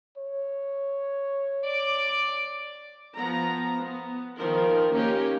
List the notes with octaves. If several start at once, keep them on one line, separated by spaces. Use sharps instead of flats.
C#5
D5 D6
F3 B3 A#5
B3
D#3 F3 A#4
A#3 C#4 D#4 G4